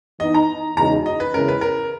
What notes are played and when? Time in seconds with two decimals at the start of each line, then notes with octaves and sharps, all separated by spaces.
0.20 E3 B3 D#4 D#5
0.34 A#5
0.77 E2 C#3 G#3 D#4 F#4 A#5
1.06 D#5
1.20 B4
1.33 E2 C#3 E3 G#3 C#4 A#4
1.48 B4
1.61 A#4